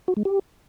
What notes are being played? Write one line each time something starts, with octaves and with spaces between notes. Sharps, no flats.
F#4
G#3
G4